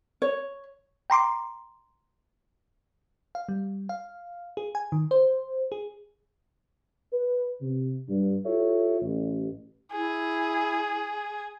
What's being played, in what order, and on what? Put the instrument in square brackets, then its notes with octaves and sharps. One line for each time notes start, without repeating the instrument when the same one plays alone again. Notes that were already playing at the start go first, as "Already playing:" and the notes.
[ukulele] C#5
[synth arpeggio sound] G5 A#5 C6 D6
[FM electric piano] F5
G3
F5
G#4
G#5
D#3
C5
G#4
[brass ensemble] B4
C3
G2
E4 F4 G4 A4 C#5 E5
A1
[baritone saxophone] E4 [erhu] G#4